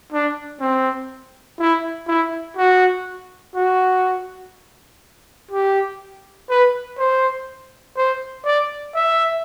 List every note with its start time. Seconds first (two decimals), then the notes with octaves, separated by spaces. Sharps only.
0.13 D4
0.60 C4
1.59 E4
2.08 E4
2.57 F#4
3.55 F#4
5.51 G4
6.49 B4
6.98 C5
7.97 C5
8.45 D5
8.95 E5